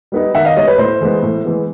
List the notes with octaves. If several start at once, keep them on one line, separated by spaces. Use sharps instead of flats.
G3 B3 D#4
D#3 E5 F#5
D#5 F5
G3 B3 D#4 C#5 D#5
B4 C#5
A2 C5
E3 G#3 B3
A2
E3 G#3 B3